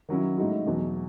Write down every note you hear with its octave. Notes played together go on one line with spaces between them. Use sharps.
D#3 F#3 C#4 E4
A2 G#3 D#4 F#4
E2 B2 F#3